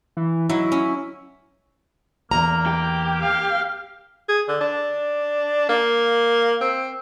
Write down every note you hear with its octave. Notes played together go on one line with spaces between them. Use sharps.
E3
F#3 D#4 E4
C#4
E2 G2 A#3 A#5
G4
F5
G#4
D3
D4
A#3
C4